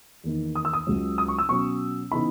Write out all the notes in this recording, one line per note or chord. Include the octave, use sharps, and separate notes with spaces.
E2 D#3 A#3 D#4
D#6
E6
D#6
C#2 C#3 F#3 C#4
D#6
C#6
E6
B2 F#3 C#4 C#6
C#3 E3 B3 D#4 B5